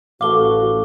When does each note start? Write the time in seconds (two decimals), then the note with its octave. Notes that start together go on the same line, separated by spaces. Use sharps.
0.21 A1 F#4 A4 F5 D6 G7